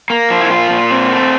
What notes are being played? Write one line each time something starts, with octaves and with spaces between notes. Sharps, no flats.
A#3
F3
E4
A#2 F4
A#2
C4
A3